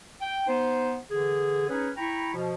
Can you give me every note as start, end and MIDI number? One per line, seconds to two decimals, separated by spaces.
0.21 0.45 79
0.48 0.95 59
0.48 0.95 63
0.48 0.95 72
1.10 1.65 50
1.10 1.65 52
1.10 1.65 68
1.69 1.89 61
1.69 1.89 63
1.69 1.89 68
1.69 1.89 71
1.69 1.89 73
1.97 2.32 64
1.97 2.32 79
1.97 2.32 82
1.97 2.32 83
1.97 2.32 85
2.34 2.54 47
2.34 2.54 53